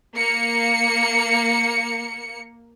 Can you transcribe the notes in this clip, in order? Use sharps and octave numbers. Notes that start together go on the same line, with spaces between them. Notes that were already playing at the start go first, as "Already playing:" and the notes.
A#3 C#7